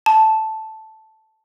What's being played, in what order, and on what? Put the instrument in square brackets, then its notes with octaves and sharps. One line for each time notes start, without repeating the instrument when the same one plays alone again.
[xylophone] A5